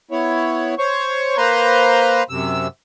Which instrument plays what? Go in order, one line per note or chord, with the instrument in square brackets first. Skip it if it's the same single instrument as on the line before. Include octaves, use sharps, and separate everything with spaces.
[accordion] B3 E4 C#5
C5 C#5 C#6
A#3 B4 C5 A#5 C6
F#2 C3 E6